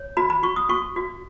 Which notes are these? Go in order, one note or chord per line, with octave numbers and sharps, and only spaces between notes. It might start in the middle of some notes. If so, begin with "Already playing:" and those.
Already playing: C#5
F#4 B5
B5
F#4 C#6
D#6
F#4 C#6
F#4